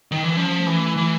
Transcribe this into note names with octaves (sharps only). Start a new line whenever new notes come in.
D#3
E3
F3 C#4
A3
E3
A3
E3